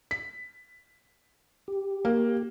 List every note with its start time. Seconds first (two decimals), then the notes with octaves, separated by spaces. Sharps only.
0.11 B6
1.68 G4
2.05 A#3